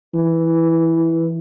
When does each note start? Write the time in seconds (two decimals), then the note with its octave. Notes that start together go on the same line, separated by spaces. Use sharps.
0.14 E3